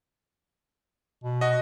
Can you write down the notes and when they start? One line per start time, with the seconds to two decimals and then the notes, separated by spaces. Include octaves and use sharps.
1.24 B2
1.41 F#4 D#5